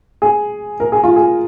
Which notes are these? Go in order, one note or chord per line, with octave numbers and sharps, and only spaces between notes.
G#4
A#4
G#4
F4
G#4